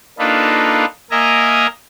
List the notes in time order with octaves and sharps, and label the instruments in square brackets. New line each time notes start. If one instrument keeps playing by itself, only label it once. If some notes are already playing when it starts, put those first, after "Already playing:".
[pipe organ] A#3 D4 D#4 F4 A4 B4
A#3 A#4 D#5 E5 G#5 A#5